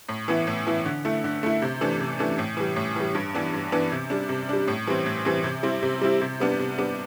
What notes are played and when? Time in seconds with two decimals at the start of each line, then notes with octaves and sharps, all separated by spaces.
0.09 A2
0.28 E3 B3 E4
0.47 A2
0.66 E3 B3 E4
0.85 D3
1.05 A3 E4
1.24 D3
1.43 A3 E4
1.62 C3
1.81 E3 A3 D4
2.00 C3
2.19 E3 A3 D4
2.38 A2
2.57 E3 G3
2.76 A2
2.96 E3 G3
3.15 G2
3.34 E3 B3 D4
3.53 G2
3.72 E3 B3 D4
3.92 C3
4.10 G3 D4
4.29 C3
4.49 G3 D4
4.68 A2
4.87 E3 G3 C4
5.06 A2
5.25 E3 G3 C4
5.44 C3
5.63 G3 C4 E4
5.82 C3
6.01 G3 C4 E4
6.21 C3
6.40 G3 B3 D4
6.59 C3
6.78 G3 B3 D4